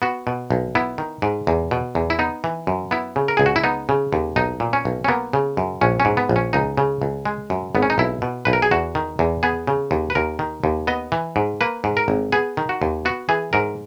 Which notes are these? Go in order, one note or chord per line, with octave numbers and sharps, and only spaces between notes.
B3 F#4
B2
B1
B3 E4
D#3
G#2
E2
B2
E2
E4
B3 D#4
E3
F#2
B3 E4
C#3
A#4
C#2 G#4
F#4
E4
B3 D#4
C#3
D#2
B1 D#4
A#2
C#4
B1
C#4
A#3 B3
C#3
F#2
A#1 C#4
C#4
G#2
B3
A#1
C#4
C#2 D#4
C#3
C#2
G#3
F#2
G#1 B3
C#4
D#4
B1 E4
B2
B1 B4
A#4
G#4
E2 F#4
D#3
E2
B3 G#4
C#3
D#2
B4
D#2 A#4
D#3
D#2
B3 D#5
E3
G#2
A#3 B4
G#2
A#4
G#1
B3 G#4
D#3
F#4
D#2
B3 F#4
E3 G#4
G#2 A#4